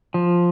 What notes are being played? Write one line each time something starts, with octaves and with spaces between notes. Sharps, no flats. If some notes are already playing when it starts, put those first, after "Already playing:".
F3